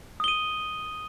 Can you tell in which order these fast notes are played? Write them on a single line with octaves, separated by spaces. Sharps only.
D#6 G7 D#7